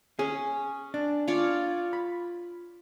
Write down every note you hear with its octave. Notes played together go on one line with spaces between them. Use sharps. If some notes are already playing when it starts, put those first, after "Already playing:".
C#4 G#4
D4
F4 C#5 D5
B5